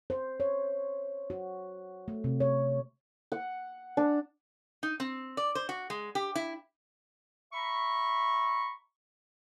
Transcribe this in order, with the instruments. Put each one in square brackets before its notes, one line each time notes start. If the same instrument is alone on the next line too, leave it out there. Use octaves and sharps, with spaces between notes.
[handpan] C5
C#5
F#4
A3
C3
C#5
[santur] F#5
D4
[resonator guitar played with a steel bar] D#4
C4
D5
C5
F#4
G#3
G4
E4
[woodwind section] E5 A#5 B5 C#6